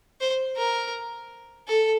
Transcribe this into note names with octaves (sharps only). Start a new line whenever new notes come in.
C5
A#4
A4